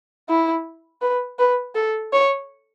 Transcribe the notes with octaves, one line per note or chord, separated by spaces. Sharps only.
E4
B4
B4
A4
C#5